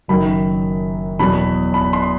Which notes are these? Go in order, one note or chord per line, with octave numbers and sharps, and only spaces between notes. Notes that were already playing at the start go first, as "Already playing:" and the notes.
F#1 F#2 D#3 F#3 B5
E2 B2 F#3 B3 B5
B5
C6